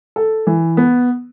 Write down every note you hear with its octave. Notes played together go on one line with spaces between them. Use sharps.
A4
E3
B3